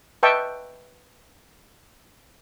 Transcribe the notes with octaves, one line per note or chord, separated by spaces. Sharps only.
B4 D#5 E5 G5 A5 C#6